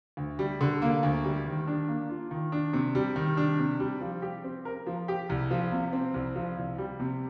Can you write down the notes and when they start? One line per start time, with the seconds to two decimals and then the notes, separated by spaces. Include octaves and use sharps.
0.17 D2
0.39 G3
0.61 D3
0.82 A#3
1.03 D2
1.24 G3
1.46 D#3
1.67 D4
1.88 A#3
2.09 F4
2.31 D#3
2.52 D4
2.73 C3
2.95 G3
3.16 D#3
3.37 D4
3.59 C3
3.80 G3
4.01 F3
4.22 G4
4.44 C4
4.65 A#4
4.86 F3
5.08 G4
5.29 C2
5.51 F3
5.72 C3
5.93 C4
6.14 C2
6.36 F3
6.57 C2
6.78 G3
7.00 C3